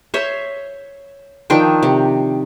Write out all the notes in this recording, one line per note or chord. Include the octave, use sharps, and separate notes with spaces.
C5 C#5 E5
D#3 F3 D4 G5
C3